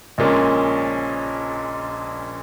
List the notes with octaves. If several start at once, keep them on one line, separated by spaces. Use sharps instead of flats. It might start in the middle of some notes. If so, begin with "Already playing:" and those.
A#1 A#2 G#3 C#4